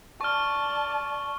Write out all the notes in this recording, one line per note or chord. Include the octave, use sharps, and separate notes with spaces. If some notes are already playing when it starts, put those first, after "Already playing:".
D5 A5 C#6 F6